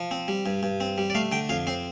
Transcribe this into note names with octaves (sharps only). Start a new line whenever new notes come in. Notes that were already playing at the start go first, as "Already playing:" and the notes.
Already playing: F3
C4
G3
G2
G2
C4
G3
D5
A3 F5
D3 G5
F2 F5
C4 C5